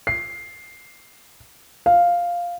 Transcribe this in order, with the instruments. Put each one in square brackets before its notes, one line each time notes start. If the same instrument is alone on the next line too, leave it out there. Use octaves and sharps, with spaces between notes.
[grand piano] C7
F5